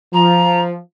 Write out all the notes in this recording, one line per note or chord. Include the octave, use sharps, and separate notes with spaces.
F3 A#5